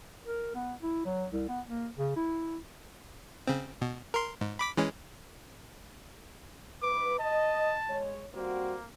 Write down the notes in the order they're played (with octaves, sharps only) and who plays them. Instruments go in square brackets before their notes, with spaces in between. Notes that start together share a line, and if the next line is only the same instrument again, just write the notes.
[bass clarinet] A#4
B3
E4
F#3
C2
B3
A#3
C#3
E4
[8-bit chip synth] C#3 C4
B2
A#4 C6
G#2
B5 D6 B6
E3 G#3 C#4
[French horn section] G#2 B4 [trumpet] D6
[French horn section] D#5 [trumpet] A5
[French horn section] G#3 C#5
[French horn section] G3 C4 F#4 [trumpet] A#3